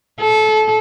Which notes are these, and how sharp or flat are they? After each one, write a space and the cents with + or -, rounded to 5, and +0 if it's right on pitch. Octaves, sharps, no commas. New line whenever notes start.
A4 -25